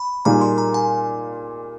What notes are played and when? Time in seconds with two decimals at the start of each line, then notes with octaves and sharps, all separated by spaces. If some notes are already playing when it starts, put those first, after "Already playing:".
Already playing: B5
0.25 A#2 G3 A#3 D#4 G#4 A#5
0.41 C6
0.58 A#5
0.74 G#5